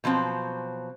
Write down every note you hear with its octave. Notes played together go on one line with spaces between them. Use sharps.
B2 F3 F#3 C4